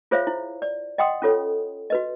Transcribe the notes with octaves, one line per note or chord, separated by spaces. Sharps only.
F4 G#4 C5 C#5 E5 F5
E4
D5
D#5 F#5 G5 C6 D#6
C#4 F4 A4 C#5
F#4 B4 D#5